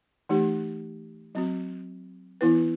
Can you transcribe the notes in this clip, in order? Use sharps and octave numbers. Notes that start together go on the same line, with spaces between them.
E3 A3 D#4 G4
F#3 C4 F#4
E3 B3 E4 B4